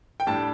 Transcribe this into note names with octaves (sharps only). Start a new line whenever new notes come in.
G5
A2 G3 D4 A5